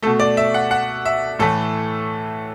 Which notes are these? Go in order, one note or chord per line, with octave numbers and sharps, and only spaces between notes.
B2 A3 A4
D5
E5
F#5
F#5
E5
A2 E3 A3 A4